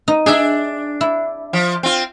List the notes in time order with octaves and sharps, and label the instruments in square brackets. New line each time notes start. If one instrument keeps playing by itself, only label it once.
[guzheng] D#4
[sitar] D4 [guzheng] G#4 E5
[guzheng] E4
[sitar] F3
C4 F4